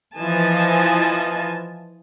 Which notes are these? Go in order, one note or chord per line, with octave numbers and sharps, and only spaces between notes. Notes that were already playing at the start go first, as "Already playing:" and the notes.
E3 F3 D#5 G#5 A5